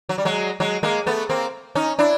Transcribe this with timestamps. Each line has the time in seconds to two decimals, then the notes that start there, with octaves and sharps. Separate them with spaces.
0.09 F#3
0.18 G3
0.25 F#3 G#3
0.60 F#3 G#3
0.83 G#3 A#3
1.07 A3 B3
1.29 A#3 C4
1.75 C#4 D#4
1.99 D4 E4